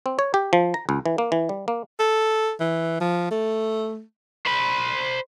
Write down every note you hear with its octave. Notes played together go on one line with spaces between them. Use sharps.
C4
C#5
G4
F3
A#5
C#2
E3
A#3
E3
G3
A#3
A4
E3
F3
A3
C5 B5